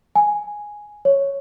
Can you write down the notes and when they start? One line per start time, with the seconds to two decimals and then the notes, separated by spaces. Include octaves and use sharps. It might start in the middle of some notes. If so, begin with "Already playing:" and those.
0.16 G#5
1.05 C#5